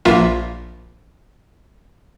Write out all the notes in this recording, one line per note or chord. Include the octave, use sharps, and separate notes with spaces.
A#1 A#3 F4 E5